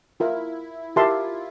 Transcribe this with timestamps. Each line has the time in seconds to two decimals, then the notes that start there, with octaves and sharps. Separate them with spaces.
0.20 E4 F4 A#4 E5
0.96 F4 G4 A#4 E5 A5 C6